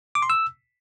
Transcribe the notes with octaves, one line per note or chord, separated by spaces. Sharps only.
D6
C6
E6